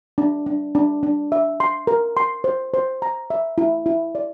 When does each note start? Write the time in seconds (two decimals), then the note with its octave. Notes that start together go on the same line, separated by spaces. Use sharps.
0.18 D4
0.46 D4
0.75 D4
1.03 D4
1.32 E5
1.60 C6
1.87 A#4
2.17 C6
2.44 C5
2.74 C5
3.02 A#5
3.30 E5
3.58 E4
3.86 E4
4.15 D5